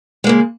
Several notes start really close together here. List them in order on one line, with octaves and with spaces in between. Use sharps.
G#3 A#3 C#3